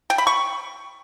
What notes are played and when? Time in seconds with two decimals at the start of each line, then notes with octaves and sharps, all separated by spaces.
0.10 G5
0.18 B5
0.27 C#6